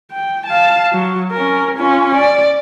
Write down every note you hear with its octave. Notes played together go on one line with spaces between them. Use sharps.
G5
F5 A5
F#3
C#4 A#4
C#4 F4
D5